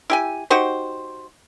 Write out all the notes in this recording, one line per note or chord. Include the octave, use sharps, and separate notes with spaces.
E4 G4 G#5
D#4 F#4 G4 C5